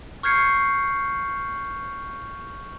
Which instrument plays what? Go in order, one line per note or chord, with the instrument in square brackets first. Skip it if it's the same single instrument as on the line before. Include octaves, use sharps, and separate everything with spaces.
[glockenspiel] C#6 F6 G6 G#6 C7 C#7